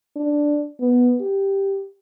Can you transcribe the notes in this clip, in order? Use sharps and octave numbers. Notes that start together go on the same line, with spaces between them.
D4
B3
G4